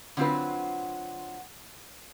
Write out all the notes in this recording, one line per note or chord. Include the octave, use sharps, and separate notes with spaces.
D3 F#3 C4 F4 F#4 B4